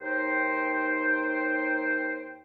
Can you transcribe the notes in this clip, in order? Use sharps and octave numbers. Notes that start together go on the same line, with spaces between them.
D#2 D#4 C5 G5